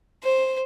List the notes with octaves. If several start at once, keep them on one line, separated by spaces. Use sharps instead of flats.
C5